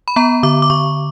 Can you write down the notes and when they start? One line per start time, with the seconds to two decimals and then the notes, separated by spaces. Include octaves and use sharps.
0.08 B5
0.16 B3 A#5
0.43 D3 D6
0.62 D6
0.70 D3 C#6